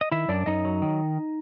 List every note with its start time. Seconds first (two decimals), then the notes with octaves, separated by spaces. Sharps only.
0.01 D#5
0.12 D#3 E4 E5
0.28 F#2 D4 D5
0.46 F#2 D#4 D#5
0.65 F#3
0.82 D#3